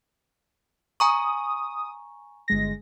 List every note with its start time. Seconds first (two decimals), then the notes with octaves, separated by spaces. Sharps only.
1.00 G#5 A#5 C#6 D#6
2.48 G1 G#3 A#6